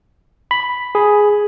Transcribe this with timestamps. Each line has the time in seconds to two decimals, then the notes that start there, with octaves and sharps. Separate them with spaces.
0.51 B5
0.95 G#4